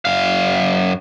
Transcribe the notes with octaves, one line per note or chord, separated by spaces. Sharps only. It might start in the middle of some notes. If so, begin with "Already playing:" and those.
F#2 F5